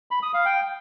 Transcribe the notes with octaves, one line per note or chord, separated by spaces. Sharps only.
B5
D#6
F5
G5